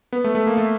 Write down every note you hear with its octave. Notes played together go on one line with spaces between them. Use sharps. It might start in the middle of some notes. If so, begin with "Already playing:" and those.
B3
A3
A3
A#3
A3